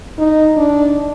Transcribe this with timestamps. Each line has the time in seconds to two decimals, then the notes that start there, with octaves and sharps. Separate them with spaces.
0.18 D#4
0.57 D4